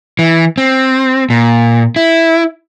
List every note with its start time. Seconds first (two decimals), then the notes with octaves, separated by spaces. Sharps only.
0.19 E3
0.58 C4
1.30 A#2
1.96 E4